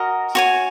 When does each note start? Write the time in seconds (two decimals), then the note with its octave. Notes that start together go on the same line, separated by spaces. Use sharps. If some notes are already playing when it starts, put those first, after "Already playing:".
Already playing: F#4 A#4 D#5
0.35 F#4 C#5 G#5